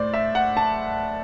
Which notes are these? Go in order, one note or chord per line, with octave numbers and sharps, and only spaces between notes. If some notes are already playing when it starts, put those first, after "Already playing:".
Already playing: A2 C5 D5
E5
F#5
A5